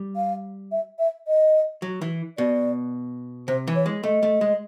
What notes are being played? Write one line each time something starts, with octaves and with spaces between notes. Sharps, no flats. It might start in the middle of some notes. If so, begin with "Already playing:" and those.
Already playing: G3
F5
E5
E5
D#5
F#3
E3
B2 D5
C3 C5
E3
C#5
G#3
A3 D#5
A3
G#3